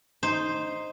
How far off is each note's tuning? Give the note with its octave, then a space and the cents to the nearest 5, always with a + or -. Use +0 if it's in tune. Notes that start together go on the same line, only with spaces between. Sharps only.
D#4 +0 C5 +0